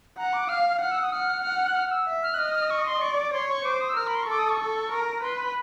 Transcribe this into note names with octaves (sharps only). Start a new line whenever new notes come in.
F#5 A#5
D6
F5 F6
F#5 F6
E6
D#6
F#5 F6
F#5
F#6
F6
E6
E5
F6
F#6
D#5 F6
F6
C#6
C6
D5 C#6
D6
C#5 C6
C#6
C5 D6
D#6
E6
A#4 F6
B5
C6
C#6
A4 D6
D#6
C#6
A4
A#4
B4 C6
B5